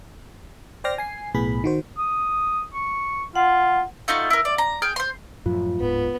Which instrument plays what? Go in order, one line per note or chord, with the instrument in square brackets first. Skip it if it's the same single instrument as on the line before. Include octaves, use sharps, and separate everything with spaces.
[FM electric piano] C5 D5 G5 C6 F6 A#6
G#5 C7
B1 A2 B3 G#4 B5
D#3 F#4 C5
[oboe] D#6
C#6
[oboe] F4 [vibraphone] F#5
[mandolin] A3 D#4 F4 F#4
E4 A#4
D5
A#5
G#4 G5 F6
C5 C6
[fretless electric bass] F#2 A2 F3 [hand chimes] F4
[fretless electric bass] D1 G#2 [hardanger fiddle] B3